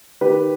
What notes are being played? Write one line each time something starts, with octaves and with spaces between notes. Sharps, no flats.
D#3 G4 B4